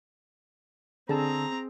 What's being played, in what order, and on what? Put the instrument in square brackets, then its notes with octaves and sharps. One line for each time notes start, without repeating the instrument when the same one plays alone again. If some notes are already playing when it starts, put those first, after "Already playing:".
[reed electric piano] D3 A5 E6 [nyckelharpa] C4 [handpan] G#4 [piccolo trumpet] A#5